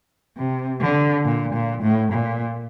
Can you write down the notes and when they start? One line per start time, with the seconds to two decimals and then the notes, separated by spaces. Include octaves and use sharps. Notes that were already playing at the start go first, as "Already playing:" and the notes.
0.37 C3
0.81 D3
1.25 A#2
1.54 A#2
1.83 A2
2.12 A#2